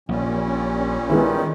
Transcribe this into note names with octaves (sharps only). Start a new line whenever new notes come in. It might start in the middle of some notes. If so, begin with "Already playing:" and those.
A#1 A#2 G3 C#4
D#3 G#3 B3 E4